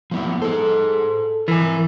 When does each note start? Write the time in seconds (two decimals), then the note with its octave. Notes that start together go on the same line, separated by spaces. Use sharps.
0.11 F3 B3 E4
0.42 G#4 A4 C5
1.48 E3 A#4 G#5